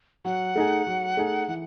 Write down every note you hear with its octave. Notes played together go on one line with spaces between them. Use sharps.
F#3 F#5
A3 D#4 G#4
F#3
A3 D#4 G#4
E3 F#5